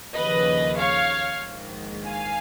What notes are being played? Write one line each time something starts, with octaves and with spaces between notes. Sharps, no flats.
D#2 C#3 F3 B4 D#5
C#5 F5
A#1 G#2 D#3
F5 G#5